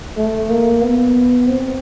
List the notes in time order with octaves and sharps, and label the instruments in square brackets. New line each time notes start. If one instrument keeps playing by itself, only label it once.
[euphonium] A3
A#3
B3
C4